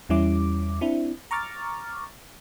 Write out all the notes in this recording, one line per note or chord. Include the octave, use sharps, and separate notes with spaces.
E2 G3 C#4 E4 D6
C4 D4 E4
A#5 C#6 D6 F6 A6